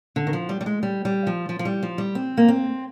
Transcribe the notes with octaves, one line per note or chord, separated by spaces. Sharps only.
D3
D#3
F3
G3
G3
G#3
G3
G3
F3
F3
F3
G3
F3
G3
C4
A#3
C4